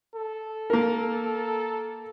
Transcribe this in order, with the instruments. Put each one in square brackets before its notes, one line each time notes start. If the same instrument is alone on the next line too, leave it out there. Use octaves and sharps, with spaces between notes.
[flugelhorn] A4
[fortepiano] A#3 A#4